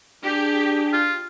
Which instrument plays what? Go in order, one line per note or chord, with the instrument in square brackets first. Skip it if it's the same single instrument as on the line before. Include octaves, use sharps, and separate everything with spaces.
[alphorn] D4 [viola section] G4 G#4
[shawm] F4